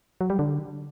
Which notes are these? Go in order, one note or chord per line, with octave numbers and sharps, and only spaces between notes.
F#3
G3
D3